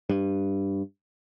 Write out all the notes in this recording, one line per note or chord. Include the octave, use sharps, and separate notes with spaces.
G2